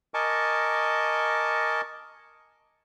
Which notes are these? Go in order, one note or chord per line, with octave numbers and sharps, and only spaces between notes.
A#4 D#5 G#5 A5 C#6 D6